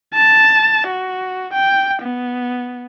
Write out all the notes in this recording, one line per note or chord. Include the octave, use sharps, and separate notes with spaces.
A5
F#4
G5
B3